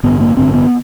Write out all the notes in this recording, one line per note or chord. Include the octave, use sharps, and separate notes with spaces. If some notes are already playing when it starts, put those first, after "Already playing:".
A1 G2 D3 B3
A#3
A1 G2 D3 C4
B3